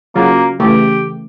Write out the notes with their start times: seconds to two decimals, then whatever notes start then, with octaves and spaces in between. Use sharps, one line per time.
0.15 C#3 F#3 A#3 F4
0.60 C#3 E3 A3 G4